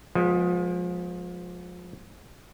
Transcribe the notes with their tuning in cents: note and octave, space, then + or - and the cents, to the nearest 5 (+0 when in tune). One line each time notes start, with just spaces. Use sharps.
F3 +30 G#3 +10 B3 +0